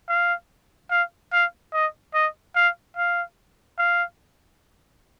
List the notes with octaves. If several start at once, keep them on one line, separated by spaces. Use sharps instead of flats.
F5
F5
F5
D#5
D#5
F5
F5
F5